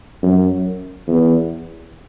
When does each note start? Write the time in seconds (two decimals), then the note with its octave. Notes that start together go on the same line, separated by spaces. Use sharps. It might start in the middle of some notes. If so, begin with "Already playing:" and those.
0.23 F#2
1.08 E2